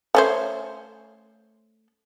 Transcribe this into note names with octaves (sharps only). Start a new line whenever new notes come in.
A3 C#4 C5